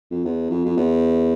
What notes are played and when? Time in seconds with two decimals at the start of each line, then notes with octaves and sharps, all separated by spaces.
0.11 F2
0.25 E2
0.50 F2
0.65 F2
0.77 E2